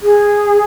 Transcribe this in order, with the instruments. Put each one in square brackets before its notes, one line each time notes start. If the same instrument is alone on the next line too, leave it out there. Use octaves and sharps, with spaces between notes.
[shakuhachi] G#4